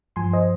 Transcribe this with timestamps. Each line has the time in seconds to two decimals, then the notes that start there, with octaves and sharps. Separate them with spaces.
0.16 G2 F3 G#5 C6
0.33 C5 D#5